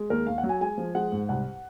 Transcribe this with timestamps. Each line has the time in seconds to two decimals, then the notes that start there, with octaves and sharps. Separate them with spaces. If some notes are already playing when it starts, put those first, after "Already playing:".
Already playing: G#3
0.10 D#2 A#4
0.26 D#2 F5
0.38 F#5
0.43 F#3
0.49 G#5
0.61 G#3 G#5
0.78 F3
0.95 G#3 F#5
1.12 G#2
1.29 C2 F#5